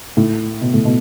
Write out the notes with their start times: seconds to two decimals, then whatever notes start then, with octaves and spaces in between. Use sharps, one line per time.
0.17 A2
0.61 B2
0.74 A2
0.85 B2